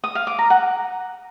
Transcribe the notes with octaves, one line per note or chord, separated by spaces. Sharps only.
D#6
F5
D6
A#5
F#5